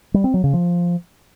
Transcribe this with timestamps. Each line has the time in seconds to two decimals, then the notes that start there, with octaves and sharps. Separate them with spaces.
0.14 G3
0.24 C4
0.34 F#3
0.44 C#3
0.53 F3